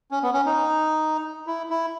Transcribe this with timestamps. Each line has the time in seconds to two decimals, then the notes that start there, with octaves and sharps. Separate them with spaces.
0.11 C#4
0.23 B3
0.33 C#4
0.46 D#4
1.47 E4
1.70 E4